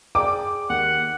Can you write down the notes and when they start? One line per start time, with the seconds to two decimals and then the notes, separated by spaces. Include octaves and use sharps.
0.15 G#4 D5 G5 D6
0.70 D#2 F#5